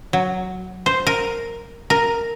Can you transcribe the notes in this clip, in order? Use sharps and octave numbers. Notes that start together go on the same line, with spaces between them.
F#3
C5
A#4
A#4